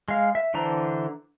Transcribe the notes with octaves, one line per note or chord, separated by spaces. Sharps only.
G#3 F5
E5
D3 E3 D4 C5 A#5